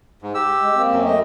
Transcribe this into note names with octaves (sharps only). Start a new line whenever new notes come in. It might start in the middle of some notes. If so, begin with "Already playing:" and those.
G#2
G4 E6
G#3
A#3 C4
F#2
A3 D#5